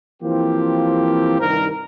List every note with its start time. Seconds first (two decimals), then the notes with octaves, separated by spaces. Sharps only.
0.22 E3 F3 A#3 C4 F4 G4
1.40 C2 G2 D#3 A#4